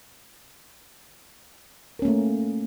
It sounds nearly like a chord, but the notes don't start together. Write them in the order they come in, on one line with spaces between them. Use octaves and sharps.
A#4 C#4 A#3 A3